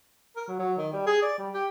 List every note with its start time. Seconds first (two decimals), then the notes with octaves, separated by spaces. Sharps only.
0.36 A#4
0.48 F#3
0.59 F#3
0.77 D#3
0.93 G3
1.06 G#4
1.22 D5
1.39 G3
1.54 G4